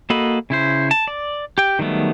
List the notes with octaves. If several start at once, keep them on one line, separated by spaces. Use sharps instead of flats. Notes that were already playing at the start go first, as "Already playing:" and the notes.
A#3 F#4 A4 D#5 B5
C#3 E4 C5
A5
D5
G4 G5
D#3 F#3 G3 A3 B3